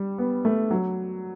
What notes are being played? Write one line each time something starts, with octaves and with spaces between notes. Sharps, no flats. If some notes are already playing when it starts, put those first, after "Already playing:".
Already playing: G3
B3
A3
F#3